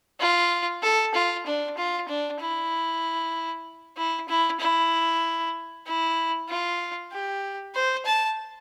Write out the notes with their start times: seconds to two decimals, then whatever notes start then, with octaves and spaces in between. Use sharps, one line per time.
0.20 F4
0.83 A4
1.14 F4
1.46 D4
1.77 F4
2.08 D4
2.40 E4
3.97 E4
4.28 E4
4.60 E4
5.86 E4
6.49 F4
7.12 G4
7.75 C5
8.05 A5